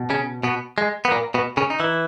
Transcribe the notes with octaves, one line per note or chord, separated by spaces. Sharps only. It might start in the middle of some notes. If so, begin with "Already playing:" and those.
Already playing: B2
C#3 C#4
B2 B3
G#3
B3
A#2 A#3
B2 B3
C#3 C#4
D#4
E3 E4